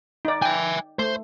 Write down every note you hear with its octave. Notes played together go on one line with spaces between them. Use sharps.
D#4 D5
E5 G5 G#5
A3 C5